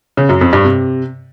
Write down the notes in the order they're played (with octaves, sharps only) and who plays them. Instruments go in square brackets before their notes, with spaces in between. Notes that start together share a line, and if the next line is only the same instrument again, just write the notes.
[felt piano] C#3
F#2
F2
G2
C3